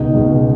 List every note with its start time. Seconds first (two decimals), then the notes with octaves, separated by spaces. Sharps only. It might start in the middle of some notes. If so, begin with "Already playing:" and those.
Already playing: C#2 B2 D#4
0.14 C#2 B2